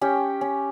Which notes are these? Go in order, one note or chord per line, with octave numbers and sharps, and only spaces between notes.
C#4 G4 G5
C#4